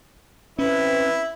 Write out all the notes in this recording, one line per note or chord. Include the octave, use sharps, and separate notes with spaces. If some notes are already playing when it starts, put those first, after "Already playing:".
C4 C#4 E4 B4